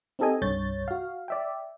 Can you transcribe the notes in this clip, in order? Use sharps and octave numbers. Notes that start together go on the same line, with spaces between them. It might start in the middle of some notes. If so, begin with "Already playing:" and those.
C4 D#4 G4 A4 D#5 G#5
C2 G2 C#5 G6 A6
F#4 F5
D5 E5 G5